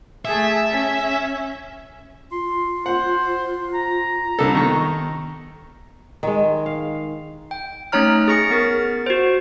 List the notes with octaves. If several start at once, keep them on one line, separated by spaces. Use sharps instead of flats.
A3 G#4 E5
C#4
F4 C6
C5 F#5
A#5
C2 D4 A4
D#3 B3 C#6
D#3 G#3
F5
G5
A3 C#4 D#4 C#5 A#5 F6
G#4 C#6 A#6 C#7
B3 A#4 A6
F#4 C5